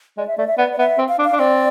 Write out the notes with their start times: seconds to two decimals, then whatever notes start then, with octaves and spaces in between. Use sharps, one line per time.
0.17 G#3 D5
0.27 E5
0.38 A3 D5
0.48 E5
0.58 B3 D5
0.73 D5
0.78 B3 E5
0.98 C4
1.08 F5
1.19 D4
1.24 F5
1.33 D4
1.39 C4 D5